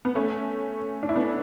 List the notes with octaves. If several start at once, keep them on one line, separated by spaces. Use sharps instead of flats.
B3
A3 C#4
D4
E4
B3 D4